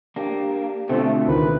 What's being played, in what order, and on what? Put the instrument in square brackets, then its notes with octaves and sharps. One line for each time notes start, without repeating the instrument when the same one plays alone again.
[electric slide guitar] A#3 D4 [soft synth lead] G4
[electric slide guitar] B2 D3 [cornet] A3 [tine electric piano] C4 F4
[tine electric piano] C#2 D#3 [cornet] B4